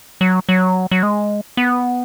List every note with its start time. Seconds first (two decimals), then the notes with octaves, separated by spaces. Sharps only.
0.21 F#3
0.49 F#3
0.91 F#3
1.03 G#3
1.57 B3